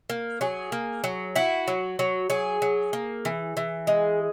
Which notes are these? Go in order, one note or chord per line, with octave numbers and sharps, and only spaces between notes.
A#3
F#3 G#4
A#3
F#3
E4 F#4
F#3
F#3
F#3 G#4
F#3
A#3
E3
E3
G#3